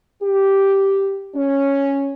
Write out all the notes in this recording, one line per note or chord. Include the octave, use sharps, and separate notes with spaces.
G4
C#4